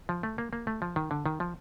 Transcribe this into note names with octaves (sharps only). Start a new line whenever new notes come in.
F3
A3
A#3
A#3
A3
F3
D#3
D3
D#3
F3